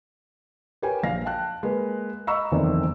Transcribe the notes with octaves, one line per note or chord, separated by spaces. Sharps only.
G4 A#4 B4 C#5 G5 G#5
A#1 F5 A#6
G5 A5 F#6
G#3 A#3 B4
D#5 A#5 B5 C#6 E6
F#1 E2 D#3 A3 C4 D5